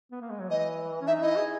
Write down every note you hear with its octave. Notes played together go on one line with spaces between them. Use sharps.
B3
A#3
G#3
F#3
E3 D#5
C#4
D#4 E5
E4 D#5
G#4